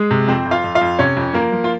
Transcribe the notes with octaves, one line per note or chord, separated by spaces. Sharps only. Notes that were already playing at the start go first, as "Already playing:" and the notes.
Already playing: G#3 G#4
C3
F2 C4 C5
F2
F4 F5
F2
F4 F5
F2
C3 C#4 C#5
F2
F3 A#3 A#4
F3
F4